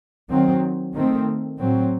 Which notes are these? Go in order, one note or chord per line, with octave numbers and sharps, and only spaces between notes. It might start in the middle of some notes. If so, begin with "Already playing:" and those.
D#3 F#3 C4
D#3 A3 C4
A2 F#3 C4